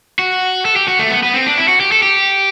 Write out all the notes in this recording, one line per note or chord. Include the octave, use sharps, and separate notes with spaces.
F#4
A4
G4
F#4
A3
B3
B3
C4
D4
E4
F#4
G4
A4
G4